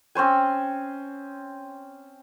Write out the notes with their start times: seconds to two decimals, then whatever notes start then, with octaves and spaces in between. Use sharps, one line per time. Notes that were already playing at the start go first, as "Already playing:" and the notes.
0.15 C4 C#4 C5 G#5